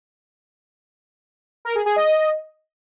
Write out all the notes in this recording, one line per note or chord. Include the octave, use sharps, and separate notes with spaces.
A#4
G#4
G#4
D#5